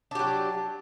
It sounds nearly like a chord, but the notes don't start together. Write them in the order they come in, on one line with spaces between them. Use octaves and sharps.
D4 G4 F#3